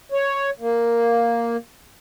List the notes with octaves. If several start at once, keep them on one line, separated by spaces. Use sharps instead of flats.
C#5
A#3